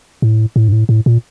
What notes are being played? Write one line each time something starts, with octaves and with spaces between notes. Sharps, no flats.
A2
A2
G2
A2
A2
A#2